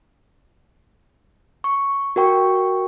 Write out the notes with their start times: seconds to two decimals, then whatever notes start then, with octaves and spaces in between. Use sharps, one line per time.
1.64 C#6
2.16 F#4 A#4 G5 C#6